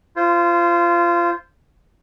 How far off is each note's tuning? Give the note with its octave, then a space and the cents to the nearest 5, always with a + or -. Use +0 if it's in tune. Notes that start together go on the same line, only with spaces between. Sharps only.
F4 -25 C5 +0